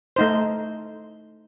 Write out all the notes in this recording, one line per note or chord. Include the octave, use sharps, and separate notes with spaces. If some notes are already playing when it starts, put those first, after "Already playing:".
A3 D#4 C5